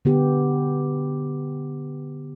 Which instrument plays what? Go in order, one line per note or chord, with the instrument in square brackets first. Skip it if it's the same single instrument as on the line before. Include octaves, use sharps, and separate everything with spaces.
[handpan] D3 B3 G4